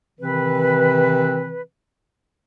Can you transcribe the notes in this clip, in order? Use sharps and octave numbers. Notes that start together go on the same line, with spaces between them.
C3 D#3 E3 C4 B4